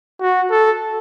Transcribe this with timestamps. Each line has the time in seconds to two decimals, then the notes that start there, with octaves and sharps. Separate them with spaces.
0.21 F#4
0.51 A4